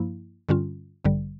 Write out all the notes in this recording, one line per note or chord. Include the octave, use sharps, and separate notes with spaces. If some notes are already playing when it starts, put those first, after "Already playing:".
Already playing: G2 F3 A#3 E4
G2 D3 G3 C#4 F4
A1 G2 D3 G3